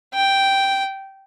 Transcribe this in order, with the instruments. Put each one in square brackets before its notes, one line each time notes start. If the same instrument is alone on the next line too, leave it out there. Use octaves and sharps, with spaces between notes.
[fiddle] G5